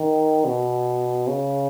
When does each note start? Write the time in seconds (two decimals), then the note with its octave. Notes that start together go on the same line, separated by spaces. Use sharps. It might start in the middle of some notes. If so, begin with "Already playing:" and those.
Already playing: D#3
0.45 B2
1.28 C#3